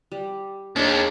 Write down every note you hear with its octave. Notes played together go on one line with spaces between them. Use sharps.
G3
D#2 D4 G#4